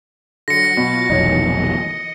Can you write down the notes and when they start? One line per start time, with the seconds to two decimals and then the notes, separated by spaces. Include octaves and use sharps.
0.48 D3 F#3 F#4 A#6 C#7
0.77 B2 F4 F#4 A6
1.10 F1 B1 D#3 E3 D#4 C#5
1.49 D#5